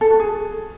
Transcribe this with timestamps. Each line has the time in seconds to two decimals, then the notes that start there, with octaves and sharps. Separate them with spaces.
0.01 A4
0.10 F#4
0.20 G#4